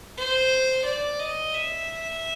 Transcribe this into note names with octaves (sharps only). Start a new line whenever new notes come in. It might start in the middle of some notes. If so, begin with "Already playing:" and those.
C5
D5
D#5
E5